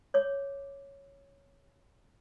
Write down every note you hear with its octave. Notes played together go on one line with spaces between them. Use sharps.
C#5 D6